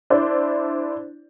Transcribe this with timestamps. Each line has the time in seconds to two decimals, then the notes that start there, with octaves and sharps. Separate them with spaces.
0.10 D4 E4 C5 D5